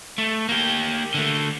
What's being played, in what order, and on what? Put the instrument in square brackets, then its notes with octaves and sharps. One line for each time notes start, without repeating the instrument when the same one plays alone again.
[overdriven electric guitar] A3
A#3 G4
D3 A3